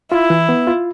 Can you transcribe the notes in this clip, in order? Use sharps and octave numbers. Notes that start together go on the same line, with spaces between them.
E4 F4
E3
B3
F4